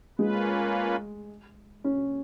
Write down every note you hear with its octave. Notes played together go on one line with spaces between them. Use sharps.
G#3 A#3 C#4 F4 B4
C#4